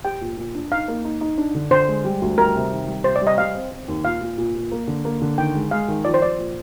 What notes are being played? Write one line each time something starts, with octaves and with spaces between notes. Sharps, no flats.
G4 G5
A#2
A#2
D4
D#4 F5
A#3
D#4
D#4
D4
D3
D3 C5
G#3
G3
D2
G3 A#4
C3
D#3
G3
C3 C5
D5
G3
D#5
G3 F5
C4
C4
D#2
A#2 F5
A#2
A#2
A#2
A#3
D3
A#3
D3
D#3 G5
G#3
G#3 F5
D#3
F3 D5
C5
F3 D5
A#2